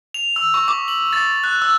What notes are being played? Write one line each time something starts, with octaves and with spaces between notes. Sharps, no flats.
F7
E6
C#6
D6
F#7
A6
F#6
E6